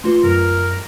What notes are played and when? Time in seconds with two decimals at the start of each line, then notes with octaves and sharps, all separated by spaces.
0.04 A3 F4 B4 C6
0.24 F#2 A#4